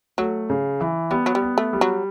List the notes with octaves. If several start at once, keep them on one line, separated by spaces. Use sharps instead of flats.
F#3 A3
C#3
E3
G3 B3
F#3
G3
B3
A3
G3
F#3